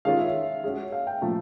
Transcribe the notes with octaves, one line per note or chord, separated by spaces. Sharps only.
D#3 G#3 C#4 F4 F5
E5
G#3 C#4 F#4
F5
G5
A#2 F3 A3